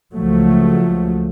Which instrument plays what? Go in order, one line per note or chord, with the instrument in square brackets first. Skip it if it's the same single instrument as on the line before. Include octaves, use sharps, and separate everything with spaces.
[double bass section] C#2 F3 F#3 A3